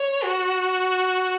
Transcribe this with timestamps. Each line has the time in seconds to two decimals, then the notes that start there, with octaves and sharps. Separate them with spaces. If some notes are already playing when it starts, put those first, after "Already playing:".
Already playing: C#5
0.24 F#4